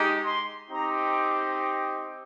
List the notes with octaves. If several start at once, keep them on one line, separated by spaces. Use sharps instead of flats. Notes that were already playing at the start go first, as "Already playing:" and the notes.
Already playing: G#3 D#4 G4
C6
C4 D#4 G4 A#5